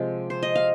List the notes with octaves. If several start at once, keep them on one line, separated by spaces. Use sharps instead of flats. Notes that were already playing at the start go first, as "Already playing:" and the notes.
Already playing: C3 F3 G#3
C5
D#5
F5